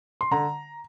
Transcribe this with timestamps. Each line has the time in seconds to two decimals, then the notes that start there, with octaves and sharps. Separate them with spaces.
0.21 C6
0.31 D3 A#5